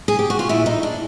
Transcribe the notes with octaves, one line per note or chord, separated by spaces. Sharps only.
G#4
G4
F#4
F4
A#2 E4
D#4
D4